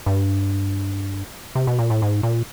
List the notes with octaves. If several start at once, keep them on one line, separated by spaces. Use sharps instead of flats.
G2
C3
B2
A#2
A2
G#2
A#2